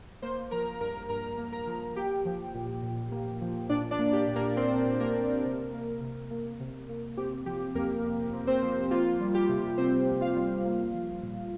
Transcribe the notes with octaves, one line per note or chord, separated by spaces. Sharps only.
A#3 C5 C6
F3 A#4 A#5
G2 A#4 A#5
G2 A#4 A#5
A#3
A#4 A#5
F3
A#3 G4 G5
F3
A#2
A#2
A#3
F3
A#2 D4 D5
D4 D5
A#3
G4
A#2
A#3 A#4
A#3 C4 C5
A#2
A#3 A#4
A#3
C3
A#3
C3
A#3
C3
A#3
C4 G4
F3 G4
F2 A#3 A#4
F2
C4
C4 C5
F3
A#3 F4
G3
G4
C3
C3 C4 C5
A#3
F4 F5
G3
A#3
F3
A#2